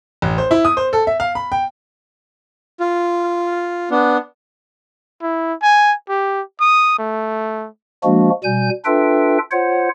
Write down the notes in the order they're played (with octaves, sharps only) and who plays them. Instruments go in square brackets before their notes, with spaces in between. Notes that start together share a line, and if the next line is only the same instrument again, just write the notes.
[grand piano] A1
C5
E4
D#6
C5
A4
E5
F5
B5
G5
[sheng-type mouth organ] F4
B3 D4
[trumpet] E4
G#5
G4
D#6
A3
[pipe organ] F3 G#3 A#3 D4 F#4
B2 G3 G#5 G6
D4 F4 A4 B4 E5 G5
F4 C5 C#5 F#5